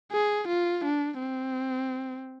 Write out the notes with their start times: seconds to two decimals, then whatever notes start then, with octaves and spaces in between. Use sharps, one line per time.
0.12 G#4
0.48 F4
0.85 D4
1.20 C4